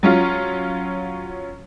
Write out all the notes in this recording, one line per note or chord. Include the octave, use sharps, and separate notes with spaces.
F#3 C#4 F4